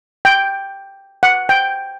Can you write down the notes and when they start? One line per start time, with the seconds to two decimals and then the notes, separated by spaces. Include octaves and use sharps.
0.25 G5
1.23 F#5
1.49 G5